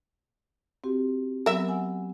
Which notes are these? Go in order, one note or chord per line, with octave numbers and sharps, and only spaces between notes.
C4 F#4 G4
F#3 B3 A#4 E5
F#5 G#5 E6